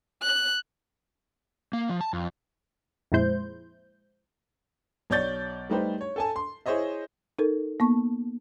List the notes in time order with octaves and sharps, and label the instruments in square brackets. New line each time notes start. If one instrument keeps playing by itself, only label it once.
[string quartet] F#6
[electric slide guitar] A#3
F3
A5
F2
[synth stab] F2 A#2 G#3 E4 C5 G6
[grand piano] B1 C#5 D5 G6 A6 G7
G3 A3 D#4 G4 B4 C5
C#5
A4 G#5 A5
C6
E4 G#4 C5 C#5 D#5 E5
[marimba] D#4 A4 A#4
A#3 B3 C#6